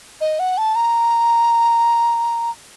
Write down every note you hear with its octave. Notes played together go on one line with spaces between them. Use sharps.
D#5
F#5
A5
A#5